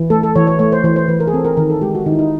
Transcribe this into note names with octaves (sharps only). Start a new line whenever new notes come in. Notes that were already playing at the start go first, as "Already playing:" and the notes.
Already playing: E3
A3 A4
A4
E3 C#5
C#5
A3 C#5
C5
E3 C5
C5
E3 B4
A#4
G#4
C4 A4
A#4
D#3 A#4
A4
G#3 G4
F#4
D#3 D#4
E4
D#4